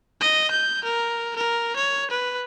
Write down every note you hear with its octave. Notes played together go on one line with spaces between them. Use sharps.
D#5
G6
A#4
A#4
C#5
B4